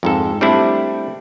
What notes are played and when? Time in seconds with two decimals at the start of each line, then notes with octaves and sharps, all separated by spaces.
0.03 F2 G#2 A4
0.41 G3 A3 C4 D4 E4